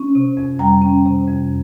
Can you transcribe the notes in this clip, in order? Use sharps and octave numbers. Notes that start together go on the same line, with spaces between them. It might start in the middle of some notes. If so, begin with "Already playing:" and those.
Already playing: C#4
C3
F2
G3 G5 A#5
C#4
C3
F2